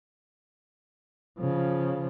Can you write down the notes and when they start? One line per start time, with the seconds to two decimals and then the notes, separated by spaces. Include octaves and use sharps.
1.39 C#3 F3